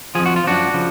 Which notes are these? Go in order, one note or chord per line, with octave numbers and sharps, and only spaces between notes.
F2 F3 G#4
F#4
F4
F#2 F3 D4 F#4
C#3 F3